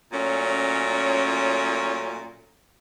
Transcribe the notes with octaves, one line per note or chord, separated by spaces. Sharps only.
A#2 F#3 A3 C#4